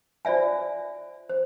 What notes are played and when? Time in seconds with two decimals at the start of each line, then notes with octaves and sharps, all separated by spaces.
0.25 F4 C5 D5 E5 G#5
1.29 C5